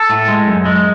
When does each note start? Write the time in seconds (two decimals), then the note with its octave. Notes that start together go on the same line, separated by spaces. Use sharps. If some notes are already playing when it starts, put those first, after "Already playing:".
Already playing: A4
0.10 A2
0.28 G#3
0.47 F#2
0.65 G#3